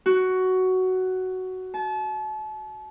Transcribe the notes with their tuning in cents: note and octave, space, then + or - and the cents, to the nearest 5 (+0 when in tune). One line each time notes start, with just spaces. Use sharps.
F#4 +10
A5 -35